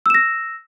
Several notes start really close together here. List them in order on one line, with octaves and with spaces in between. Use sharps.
E6 E7 A#6